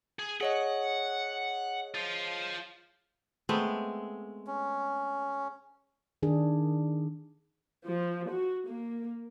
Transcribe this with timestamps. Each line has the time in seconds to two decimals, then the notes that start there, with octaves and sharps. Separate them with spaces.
0.19 G#4
0.41 G#4 C#5 D#5 F#5
1.95 F4 C5
3.49 G#3 A3 B3 C4
4.47 C#4
6.23 D#3 D4 G#4
7.86 F3
8.29 F#4
8.67 A#3